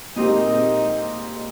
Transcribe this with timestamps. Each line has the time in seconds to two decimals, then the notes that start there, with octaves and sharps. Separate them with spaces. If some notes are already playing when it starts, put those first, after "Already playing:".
0.16 A#2 G#3 C4 D#4 G4 A#4
1.30 G#3